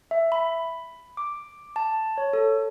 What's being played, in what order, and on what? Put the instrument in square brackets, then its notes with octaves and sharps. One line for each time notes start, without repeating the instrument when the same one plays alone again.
[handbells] E5
B5
D6
A5
C#5
A4